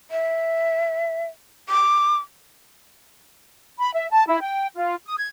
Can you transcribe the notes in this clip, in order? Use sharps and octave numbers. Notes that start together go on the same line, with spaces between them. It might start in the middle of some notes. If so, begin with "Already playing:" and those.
E5
D6
B5
E5
A5
E4
G5
F4
D#6
G#6